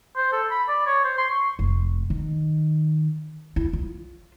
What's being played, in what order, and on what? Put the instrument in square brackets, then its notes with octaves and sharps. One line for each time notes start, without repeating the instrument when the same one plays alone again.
[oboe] C5
A4
B5
D5
C#5
C5
C6
C#6
[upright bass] F1
D#3
E4
F4